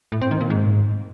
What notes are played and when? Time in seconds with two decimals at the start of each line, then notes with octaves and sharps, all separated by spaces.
0.12 A2
0.21 C4
0.31 D#3
0.41 A#2
0.50 G#2